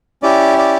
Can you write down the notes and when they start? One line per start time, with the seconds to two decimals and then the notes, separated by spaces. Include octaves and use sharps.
0.22 C#4 E4 G4 D5
0.58 D5